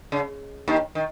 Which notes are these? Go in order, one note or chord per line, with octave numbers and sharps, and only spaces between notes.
C#3
D#2 D#3
D#3